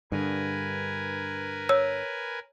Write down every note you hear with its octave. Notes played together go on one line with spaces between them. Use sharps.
G2 D3 A#4 B4 G#5
C#5 E6